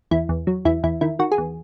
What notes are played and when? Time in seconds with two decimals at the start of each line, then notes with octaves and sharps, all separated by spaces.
0.11 E2 E4
0.29 E2
0.47 F#3
0.65 E2 E4
0.83 E2 E4
1.01 D#3 E4
1.19 D#3 F#4
1.32 G#4
1.38 E2